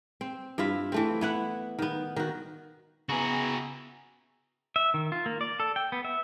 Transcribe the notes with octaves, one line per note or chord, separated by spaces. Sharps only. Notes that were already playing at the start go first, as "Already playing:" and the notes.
C4
G2 E4 F4 E5
E3 A3 C4
B3 E4 F#5
D#3 B3
D#3 F#4
C#3 B3 E4 F#4 G#4 G#5 A#5
E5
D#3
F4
A#3
D5
A4
G5
B3
E5